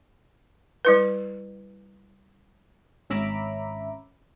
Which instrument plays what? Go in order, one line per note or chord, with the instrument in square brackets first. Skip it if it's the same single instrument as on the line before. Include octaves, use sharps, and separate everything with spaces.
[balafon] G3 E4 B4
[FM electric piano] G#1 C#4 E5 A#5 B5 D6